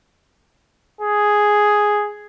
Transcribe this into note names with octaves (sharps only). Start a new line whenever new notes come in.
G#4